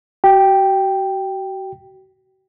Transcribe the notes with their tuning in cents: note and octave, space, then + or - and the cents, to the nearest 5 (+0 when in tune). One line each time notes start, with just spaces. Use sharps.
F#4 +40 G5 +0